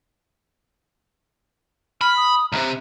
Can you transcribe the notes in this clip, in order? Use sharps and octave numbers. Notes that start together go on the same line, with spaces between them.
B5 F6
D#6
C#2 C3 A#5